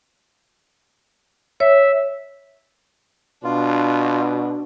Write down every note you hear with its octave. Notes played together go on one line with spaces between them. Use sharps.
C#5 E5
B2 D4 F4